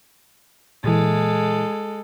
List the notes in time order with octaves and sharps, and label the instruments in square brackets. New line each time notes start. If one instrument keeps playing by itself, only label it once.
[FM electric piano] A#2 E3 [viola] G#3 A4